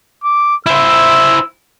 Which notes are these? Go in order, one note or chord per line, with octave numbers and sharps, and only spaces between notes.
D6
E4 C5 E6